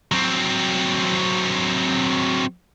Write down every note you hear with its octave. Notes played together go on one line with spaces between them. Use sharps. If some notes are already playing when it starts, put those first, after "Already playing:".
F#3 C4